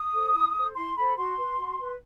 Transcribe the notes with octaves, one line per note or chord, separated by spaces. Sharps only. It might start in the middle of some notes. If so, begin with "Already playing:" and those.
Already playing: D#6
A4 C5
E4
A4 C5
E4 C6
A4 C5 B5
F#4 C6
B4
F#4
B4